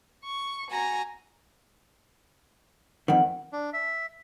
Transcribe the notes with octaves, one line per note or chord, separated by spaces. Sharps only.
C#6
F#4 G#5 A#5
F2 D#3 F#5
D4
E5